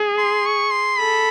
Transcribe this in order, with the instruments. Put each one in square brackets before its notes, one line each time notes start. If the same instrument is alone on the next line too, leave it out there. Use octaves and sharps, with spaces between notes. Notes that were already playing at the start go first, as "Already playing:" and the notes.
Already playing: [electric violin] G#4
[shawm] C6
C#6
C6
[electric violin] A4 [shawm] B5